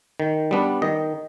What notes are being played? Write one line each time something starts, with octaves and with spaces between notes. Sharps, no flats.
D#3
G3 B3 D4
D#3 D#5